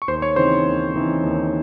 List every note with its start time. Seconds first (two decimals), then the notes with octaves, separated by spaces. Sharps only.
0.02 C#6
0.08 D#2 C5 C6
0.22 C#5 C#6
0.36 C#3 E3 C4 D#4 C5 C6
0.66 D#2
0.94 C#3 E3 C4 D#4
1.23 D#2